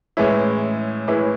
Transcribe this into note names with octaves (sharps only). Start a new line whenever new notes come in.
A2 E3 G#3 C#4 E4
A2 E3 G#3 C#4 E4